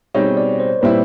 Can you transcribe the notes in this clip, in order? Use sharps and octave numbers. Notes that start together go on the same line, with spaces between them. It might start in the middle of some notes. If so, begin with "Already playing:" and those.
B2 G3 C4 D#4 G#4 C#5
D5
C5
A#2 G3 C4 E4 B4